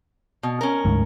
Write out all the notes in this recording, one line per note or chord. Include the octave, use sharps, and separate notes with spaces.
B2
C#4 A#4
D2 G#2